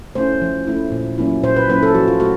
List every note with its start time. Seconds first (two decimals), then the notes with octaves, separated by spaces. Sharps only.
0.15 A3 C#4 E4 C5
0.42 F3
0.67 A3 C#4 E4
0.92 A#2
1.18 F#3 A#3 C#4 E4
1.43 A#2 C5
1.56 B4
1.69 F#3 A#3 C#4 E4 B4
1.83 A4
1.95 F3 F#4
2.08 F4
2.20 A3 F#4